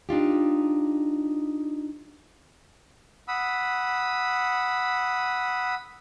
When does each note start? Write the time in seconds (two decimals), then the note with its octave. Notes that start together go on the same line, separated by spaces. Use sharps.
0.09 D4 D#4 F4 G4
3.28 F#5 B5 D#6 E6